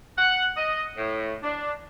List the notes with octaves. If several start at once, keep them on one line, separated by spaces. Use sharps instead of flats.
F#5
D#5
A2
D4